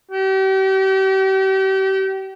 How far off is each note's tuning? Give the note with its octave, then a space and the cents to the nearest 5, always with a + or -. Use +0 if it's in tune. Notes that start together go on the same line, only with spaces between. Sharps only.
G4 -35